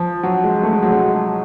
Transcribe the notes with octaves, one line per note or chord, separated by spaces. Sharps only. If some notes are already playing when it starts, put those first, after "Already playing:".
Already playing: F3
F#3
G#3
A3
G#3
F#3
G#3